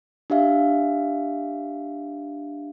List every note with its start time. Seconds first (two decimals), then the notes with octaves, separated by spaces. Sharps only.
0.30 D4 G4 E5 F5